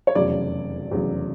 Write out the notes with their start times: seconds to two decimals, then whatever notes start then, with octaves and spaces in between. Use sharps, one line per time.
0.07 C#5
0.15 F1 E2 C#3 F#3 D5
0.91 F1 E2 C#3 F#3